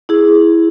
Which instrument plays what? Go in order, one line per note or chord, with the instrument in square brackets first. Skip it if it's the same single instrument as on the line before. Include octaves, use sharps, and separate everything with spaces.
[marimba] E4 G#4